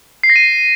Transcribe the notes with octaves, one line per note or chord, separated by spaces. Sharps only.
C7
A#6
D#7